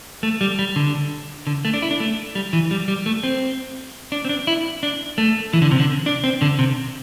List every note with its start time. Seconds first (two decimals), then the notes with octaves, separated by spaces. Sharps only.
0.23 A3
0.41 G3
0.59 G3
0.76 D3
1.47 D3
1.65 A3
1.74 D4
1.82 E4
1.91 D4
2.00 A3
2.35 G3
2.53 E3
2.71 G3
2.88 G3
3.06 A3
3.23 C4
4.12 D4
4.25 C4
4.29 D4
4.47 E4
4.83 D4
5.18 A3
5.53 E3
5.62 D3
5.71 C3
5.80 D3
6.06 D4
6.24 C4
6.42 D3
6.59 C3